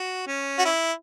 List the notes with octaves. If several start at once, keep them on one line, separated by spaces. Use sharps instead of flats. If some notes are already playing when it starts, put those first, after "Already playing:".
Already playing: F#4
C#4
F#4
E4